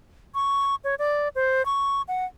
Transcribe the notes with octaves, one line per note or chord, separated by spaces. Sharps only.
C#6
C#5
D5
C5
C#6
F#5